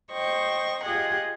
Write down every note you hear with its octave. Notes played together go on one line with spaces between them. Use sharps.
C5 D#5 G5 C#6
F4 G4 G#4 D#5 F#5